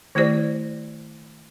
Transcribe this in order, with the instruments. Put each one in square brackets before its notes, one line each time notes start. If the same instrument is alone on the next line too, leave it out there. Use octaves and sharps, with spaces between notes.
[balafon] D#3 A3 E4 G4 C5 D5